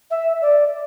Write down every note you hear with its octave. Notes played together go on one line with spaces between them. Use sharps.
E5
D5